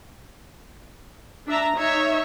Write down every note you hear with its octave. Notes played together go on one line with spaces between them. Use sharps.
D4 E5 A5 A#5
D#4 C#5 E5